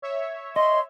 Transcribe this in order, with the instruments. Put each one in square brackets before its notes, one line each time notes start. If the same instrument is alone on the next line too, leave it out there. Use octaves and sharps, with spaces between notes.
[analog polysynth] C#5 E5
[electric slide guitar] D#5 [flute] C6